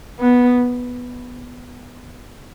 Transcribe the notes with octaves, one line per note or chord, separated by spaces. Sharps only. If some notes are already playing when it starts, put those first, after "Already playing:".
B3